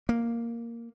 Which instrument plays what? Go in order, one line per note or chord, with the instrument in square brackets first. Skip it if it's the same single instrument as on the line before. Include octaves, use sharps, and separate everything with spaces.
[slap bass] A#3